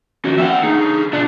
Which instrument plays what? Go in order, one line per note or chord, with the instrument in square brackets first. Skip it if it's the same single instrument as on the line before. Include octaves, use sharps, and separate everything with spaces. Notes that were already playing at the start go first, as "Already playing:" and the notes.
[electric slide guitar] D#3 F3 C#4 [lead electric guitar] F#4
[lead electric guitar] A#3 G5 [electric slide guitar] E5 F#5
[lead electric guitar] D3 G#4 [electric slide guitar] D#4
[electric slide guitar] B2 F4 D5 [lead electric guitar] D4